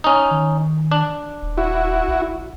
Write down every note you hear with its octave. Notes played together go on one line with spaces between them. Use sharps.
C#4 D#4
D#3
D4
D#1
E4 F#4
A#1